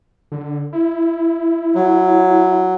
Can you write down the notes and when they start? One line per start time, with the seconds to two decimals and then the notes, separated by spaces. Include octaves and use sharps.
0.32 D3
0.73 E4
1.75 F#3